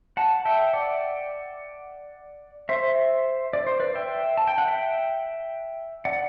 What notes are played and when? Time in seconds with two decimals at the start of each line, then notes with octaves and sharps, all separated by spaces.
0.17 F#5 A5
0.45 E5 G5
0.73 D5 F#5
2.69 C5 E5
3.53 D5
3.67 C5
3.80 B4 D5
3.95 E5 G5
4.37 A5
4.48 G5
4.58 F#5
4.68 E5 G5
6.05 D5 F#5